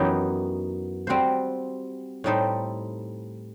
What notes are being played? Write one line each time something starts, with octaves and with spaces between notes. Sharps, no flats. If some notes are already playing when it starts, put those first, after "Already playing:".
Already playing: F#2 E3 B3 D#4 G4
G3 C4 F#4 C5
A2 G3 D#4 A4 C5